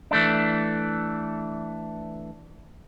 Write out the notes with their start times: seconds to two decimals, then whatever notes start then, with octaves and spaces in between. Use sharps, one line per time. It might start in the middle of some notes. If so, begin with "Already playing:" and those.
0.11 E3 A3 D4